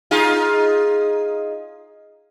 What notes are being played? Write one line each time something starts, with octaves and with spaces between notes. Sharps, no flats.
D#4 F4 G#4